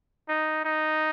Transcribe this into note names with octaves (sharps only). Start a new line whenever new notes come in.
D#4
D#4